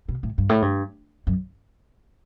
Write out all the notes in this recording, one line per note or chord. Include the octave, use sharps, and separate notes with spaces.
B2
A2
G2
A2
G2
F#2